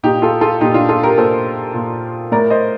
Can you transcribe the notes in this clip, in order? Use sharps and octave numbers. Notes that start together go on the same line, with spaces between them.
A#2 D#4 G4
F4 A4
F4 A4
A#2 D#4 G4
D4 F4
F4 A4
G4 A#4
A#2 A4 C5
A#2
A2 A#4 D5
C5 D#5